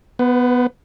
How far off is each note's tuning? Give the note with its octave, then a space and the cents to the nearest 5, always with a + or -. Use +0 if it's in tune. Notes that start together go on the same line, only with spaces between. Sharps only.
B3 +0 B4 +45